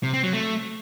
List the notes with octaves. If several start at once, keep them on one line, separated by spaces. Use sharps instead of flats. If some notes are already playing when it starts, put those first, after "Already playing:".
C3
C4
F#3
A3